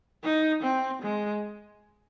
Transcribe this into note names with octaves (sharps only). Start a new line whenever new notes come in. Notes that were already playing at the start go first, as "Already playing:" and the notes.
D#4
C4
G#3